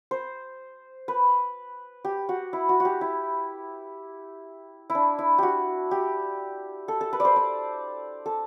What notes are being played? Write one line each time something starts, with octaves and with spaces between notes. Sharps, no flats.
C5
B4
G4
F#4
E4
F#4
F#4
G4
E4
E4
D4
E4
F#4 G4
G4
A4
A4
B4
C5 D5
D5
A4